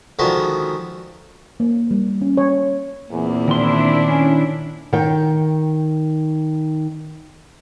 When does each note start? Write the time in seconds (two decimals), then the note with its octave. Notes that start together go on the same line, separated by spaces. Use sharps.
0.19 D3 D#3 F3 G#3 B3 F#4
1.60 A#3
1.91 G3
2.22 C#4
2.37 C#5
3.11 E2 A#2 A#3 C4
3.48 D#3 D4 E4 C6
4.08 C#4
4.93 D#3 G5